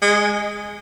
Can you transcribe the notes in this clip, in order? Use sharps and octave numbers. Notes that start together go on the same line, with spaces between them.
G#3